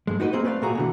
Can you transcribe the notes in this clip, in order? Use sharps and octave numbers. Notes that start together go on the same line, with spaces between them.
G2 G#3
D#4 F#4 B4 D5 D#5
A#3 C4 G#4 C5
A3 B4 D5 F5
A#2 A3 F#4 G#4 A#5
B2 D3 E3